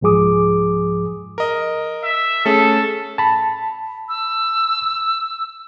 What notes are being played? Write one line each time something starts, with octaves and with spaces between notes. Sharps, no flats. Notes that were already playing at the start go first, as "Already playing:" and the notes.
C2 G#2 F3 G#4 D6 D#6
A#4 D#5
E5
A3 C#4 G#4 A4
A5 B5
E6